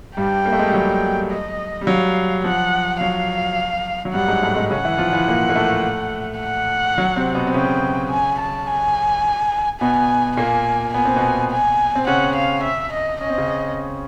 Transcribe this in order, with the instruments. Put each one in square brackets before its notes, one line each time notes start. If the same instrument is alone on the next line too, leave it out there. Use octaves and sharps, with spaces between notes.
[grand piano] G2 G3 [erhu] G5
[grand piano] A#3
A3
G#3
G3
F#3
[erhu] D#5
[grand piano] G3
[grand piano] F#3 [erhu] F5
[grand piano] F3 [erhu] F#5
[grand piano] F#3 [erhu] F5
[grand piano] F#3
[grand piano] G2 G3 [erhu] F#5
[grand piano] G#2 G#3
A2 A3
G#2 G#3
[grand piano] C#3 C#4 [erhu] F#5
[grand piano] E3 E4
F3 F4
E3 E4
A#2 A#3
A#3
A2 A3
[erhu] F#5
[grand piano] F#3
C3 C4
B2 B3
C4
[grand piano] C#3 C#4 [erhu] G5
[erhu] G#5
A5
G#5
[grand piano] B2 B3 [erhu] G#5
[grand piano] A#2 A#3 [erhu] G#5
[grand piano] B3 [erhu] G#5
[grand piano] C4
B2 B3
[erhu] G#5
[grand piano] C4
[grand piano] C#3 C#4 [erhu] F#5
[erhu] F5
E5
D#5
[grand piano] C#4 [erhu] D#5
[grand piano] C4
C#3 C#4